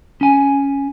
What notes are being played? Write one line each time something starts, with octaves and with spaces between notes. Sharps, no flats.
C#4 G#5